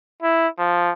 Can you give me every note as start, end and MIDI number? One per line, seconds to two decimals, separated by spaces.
0.22 0.47 64
0.58 0.92 53